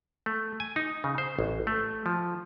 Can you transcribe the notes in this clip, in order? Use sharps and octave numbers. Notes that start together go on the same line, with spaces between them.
A3
G#5
D#4
C#3
C5
A1
A3
F3